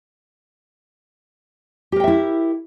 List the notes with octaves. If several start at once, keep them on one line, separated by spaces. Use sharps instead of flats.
E4 G4 A#4 E5 G5